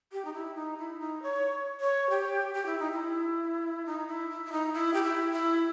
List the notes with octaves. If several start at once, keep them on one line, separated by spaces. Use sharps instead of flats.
G4
D#4
E4
D#4
E4
D#4
C#5
C#5
G4
G4
E4
D#4
E4
D#4
E4
E4
E4
D#4
E4
G4
E4
E4